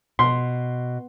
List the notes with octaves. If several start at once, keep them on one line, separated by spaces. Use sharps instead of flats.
B2 C6